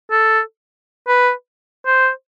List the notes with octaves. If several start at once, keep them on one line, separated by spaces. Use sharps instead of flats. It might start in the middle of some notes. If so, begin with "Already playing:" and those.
A4
B4
C5